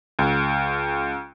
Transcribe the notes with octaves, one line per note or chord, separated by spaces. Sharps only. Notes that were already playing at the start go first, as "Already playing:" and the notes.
C#2